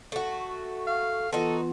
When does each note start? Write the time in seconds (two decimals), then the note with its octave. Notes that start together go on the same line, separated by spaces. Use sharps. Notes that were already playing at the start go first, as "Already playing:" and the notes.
0.12 A3 F#4
0.87 F5
1.33 E3 B3 D#4 F4 F#4 A4